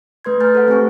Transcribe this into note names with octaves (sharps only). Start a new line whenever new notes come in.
A3 B4 C6 G#6
B4 G#5 A#5 F6 G6 A6
A4 C5 F#5
A3 C4 G4 G#5 C#6